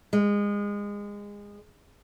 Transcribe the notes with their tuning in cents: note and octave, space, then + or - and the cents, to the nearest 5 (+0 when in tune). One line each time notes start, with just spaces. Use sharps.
G#3 -25